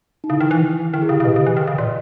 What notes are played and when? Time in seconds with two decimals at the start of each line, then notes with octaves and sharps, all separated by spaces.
0.24 D#4
0.29 C#3 E4
0.41 D#3
0.51 E3
0.93 D#3 E4
1.02 G#4
1.09 C#3 G4
1.20 C#3
1.25 B2 B4 D#5
1.36 C#3
1.47 E3
1.57 D#3
1.67 C#3
1.78 A#2 D#5